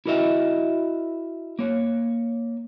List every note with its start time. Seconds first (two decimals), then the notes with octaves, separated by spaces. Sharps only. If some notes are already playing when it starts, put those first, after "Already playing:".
0.06 E4 F#4 A#4 D#5 E5
1.59 A#3 C#5